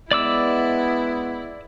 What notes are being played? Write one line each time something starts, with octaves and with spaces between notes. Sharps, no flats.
G#3 B3 E4 D5 D6 E6